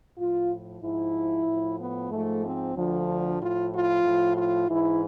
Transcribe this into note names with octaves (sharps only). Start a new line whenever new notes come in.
A2 F3 F4
G#2 F3 E4
A2 F3
B3
G#2 F3 A3
C4
D2 D3 F3
A2 F3 F4
F4
A2 F3
F4
G#2 E3 E4